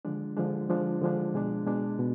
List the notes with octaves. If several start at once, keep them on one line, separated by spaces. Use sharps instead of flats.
D3 F3 G#3 D4
D3 F3 G#3 D4
D3 F3 G#3 D4
D3 F3 G#3 D4
B2 G#3 D4
B2 G#3 D4
B2